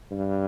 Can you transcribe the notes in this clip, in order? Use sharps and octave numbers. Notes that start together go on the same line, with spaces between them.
G2